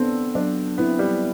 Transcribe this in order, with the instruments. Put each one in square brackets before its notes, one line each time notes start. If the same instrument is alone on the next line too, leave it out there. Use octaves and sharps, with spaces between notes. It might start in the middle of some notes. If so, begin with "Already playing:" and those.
Already playing: [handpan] B3 D4 A4 [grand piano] C4
[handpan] F#3 [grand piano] D4
[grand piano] B3 [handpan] C4 E4
[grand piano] G3